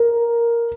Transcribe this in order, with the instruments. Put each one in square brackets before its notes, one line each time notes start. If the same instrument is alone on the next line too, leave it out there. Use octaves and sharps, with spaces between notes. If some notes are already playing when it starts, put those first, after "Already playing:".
Already playing: [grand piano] A#4